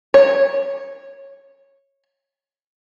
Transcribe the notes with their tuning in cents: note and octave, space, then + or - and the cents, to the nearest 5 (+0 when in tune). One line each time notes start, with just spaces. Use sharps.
C#5 -15